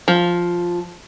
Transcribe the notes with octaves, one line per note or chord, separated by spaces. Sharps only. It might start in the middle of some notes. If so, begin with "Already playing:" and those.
F3